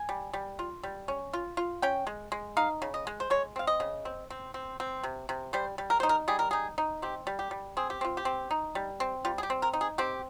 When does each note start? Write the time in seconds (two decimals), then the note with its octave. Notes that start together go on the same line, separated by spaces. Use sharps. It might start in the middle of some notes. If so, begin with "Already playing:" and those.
Already playing: G#5
0.09 G3
0.33 G3
0.59 F4
0.83 G3
1.08 C#4
1.33 F4
1.57 F4
1.82 C#4 G5
2.07 G#3
2.32 G#3
2.57 D#4 F5
2.82 C#3
2.94 D#5
3.07 G#3
3.20 C5
3.30 G#3 C#5
3.56 C4 F5
3.67 D#5
3.80 C#3
4.05 C4
4.30 C4
4.54 C4
4.80 C4
5.03 C3
5.29 C3
5.53 G3 C5
5.78 G3
5.90 A#4
6.00 D#4 C5
6.09 A#4
6.28 G3 G#4
6.39 A#4
6.51 D#4 G#4
6.78 D#4
7.02 C4 G4
7.27 G3
7.39 G4
7.51 G3
7.77 C4 G#4
7.90 G4
8.01 C4 F4
8.17 G4
8.25 C4
8.51 D#4
8.75 G3
9.00 C4
9.25 G3 F4
9.38 G#4
9.43 G4
9.50 C4
9.62 A#4
9.73 D#4
9.81 G#4
9.98 C4 G4